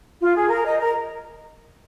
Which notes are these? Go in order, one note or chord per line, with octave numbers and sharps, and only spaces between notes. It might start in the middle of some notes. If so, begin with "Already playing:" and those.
F4
G#4
A#4
D#5
A#4